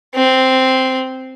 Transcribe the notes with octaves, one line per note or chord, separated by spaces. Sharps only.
C4